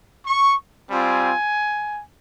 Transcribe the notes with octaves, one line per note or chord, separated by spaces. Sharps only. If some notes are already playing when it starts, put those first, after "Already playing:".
C#6
G3 C4 F4 G#5